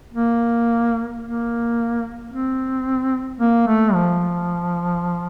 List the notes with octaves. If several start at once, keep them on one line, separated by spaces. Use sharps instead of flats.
A#3
A#3
C4
A#3
A3
F3